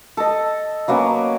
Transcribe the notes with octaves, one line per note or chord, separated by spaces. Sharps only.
A4 D#5
F#3 A#3 B3 C#4